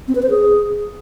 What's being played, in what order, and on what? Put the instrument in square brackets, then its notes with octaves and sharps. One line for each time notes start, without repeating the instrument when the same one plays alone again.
[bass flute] C4
B4
C5
G#4